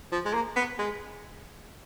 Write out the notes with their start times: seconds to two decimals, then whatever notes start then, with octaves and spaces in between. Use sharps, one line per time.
0.12 F3
0.25 G#3
0.34 A#3
0.56 B3
0.78 G#3